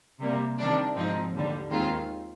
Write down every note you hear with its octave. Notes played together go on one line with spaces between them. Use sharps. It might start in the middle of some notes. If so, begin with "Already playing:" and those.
C3 G3 A#3
C3 D#3 G3 D4
G#1 G#2 F3 C4 D#4
D#2 D3 G3
D#2 D#3 G#3 C4 F4